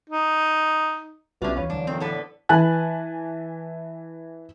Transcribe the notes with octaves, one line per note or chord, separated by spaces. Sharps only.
D#4
B1 C3 A3 C#4 D4 F4 F#4 B4
D#2 E3 B4 C#5 F5
D2 G#2 F#3 D4
F2 A#2 D#3 C4
A2 D3 B3 A4 B4
E3 B4 G#5 A5 F#6